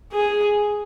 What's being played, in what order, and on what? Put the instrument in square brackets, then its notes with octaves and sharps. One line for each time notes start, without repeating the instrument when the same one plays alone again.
[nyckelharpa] G#4